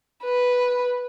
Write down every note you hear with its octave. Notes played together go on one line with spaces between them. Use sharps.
B4